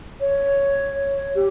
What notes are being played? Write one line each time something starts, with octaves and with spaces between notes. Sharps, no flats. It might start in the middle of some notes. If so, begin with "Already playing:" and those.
C#5
G4